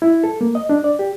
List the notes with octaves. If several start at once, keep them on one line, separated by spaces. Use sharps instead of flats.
E4
A4
A#3
D#5
D4
D5
G4